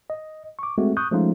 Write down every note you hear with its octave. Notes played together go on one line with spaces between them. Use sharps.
D#5
C#6 D6
G#3 A3 C4 F#4
C#6 D#6 F#6 G6
F3 G#3 A3 C#4 D#4 F4